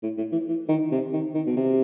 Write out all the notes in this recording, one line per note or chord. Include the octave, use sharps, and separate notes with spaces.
A2
A2
E3
E3
D#3
C3
D#3
D#3
B2
C3